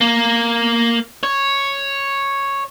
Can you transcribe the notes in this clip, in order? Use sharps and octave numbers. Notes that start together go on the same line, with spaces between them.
A#3
C#5